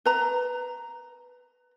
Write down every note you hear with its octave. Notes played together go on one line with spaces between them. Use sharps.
B4 A#5